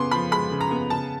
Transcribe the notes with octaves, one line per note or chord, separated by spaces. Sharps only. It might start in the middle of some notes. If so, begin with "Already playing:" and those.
Already playing: C#3 B3 C6 D6
F3 B5
G#3 B5
C#3
A#5
B3
C#3 A5